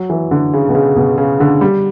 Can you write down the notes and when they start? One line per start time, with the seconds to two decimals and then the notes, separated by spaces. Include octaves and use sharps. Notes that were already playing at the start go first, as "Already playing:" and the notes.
Already playing: F#3
0.10 E3
0.31 D3
0.53 C#3
0.69 B2
0.75 C#3
0.96 B2
1.18 C#3
1.40 D3
1.61 G3